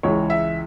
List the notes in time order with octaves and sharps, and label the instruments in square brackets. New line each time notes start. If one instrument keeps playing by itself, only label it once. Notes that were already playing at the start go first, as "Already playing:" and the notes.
[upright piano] C#2 C#3 E3 C#5
E5